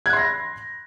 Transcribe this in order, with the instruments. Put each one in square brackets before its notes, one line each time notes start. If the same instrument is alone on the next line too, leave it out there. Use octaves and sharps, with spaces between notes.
[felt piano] G#6
F#6
C6
A#6
B5